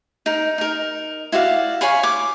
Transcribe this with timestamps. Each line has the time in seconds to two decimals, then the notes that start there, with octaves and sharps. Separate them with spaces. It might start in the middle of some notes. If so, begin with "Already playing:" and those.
0.26 D#4 A#4
0.58 D#4 A#4
1.32 E4 F#4 D5 F5
1.81 C#5 F5 G#5 B5
2.03 D6